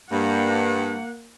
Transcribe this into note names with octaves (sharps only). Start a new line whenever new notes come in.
G2 A#3 F#5